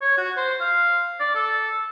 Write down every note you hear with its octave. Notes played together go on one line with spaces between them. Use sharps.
C#5
F#4
C5
F5
D5
A4